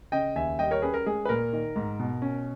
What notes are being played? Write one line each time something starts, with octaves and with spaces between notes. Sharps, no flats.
C#3 D#5 G5
D#2 E5 G#5
G3 D#5 G5
A#4 C#5
C#4 G#4 B4
A#4
G#3 G#4
B4
A#2 A#4
D#3
G#2
B2
C#4